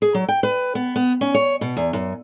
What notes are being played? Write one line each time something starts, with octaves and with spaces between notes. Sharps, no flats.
G#4
F#3
G5
B4
B3
B3
C#4
C#5
B2
E2
F#2